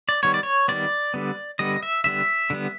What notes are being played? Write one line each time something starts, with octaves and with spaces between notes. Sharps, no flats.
D5
D#3 G3 B3 C#5
D5
C#5
D#3 G3 B3 D5
D3 G3 B3
D3 G3 B3 D#5
E5
D3 G3 B3 E5
D3 G3 B3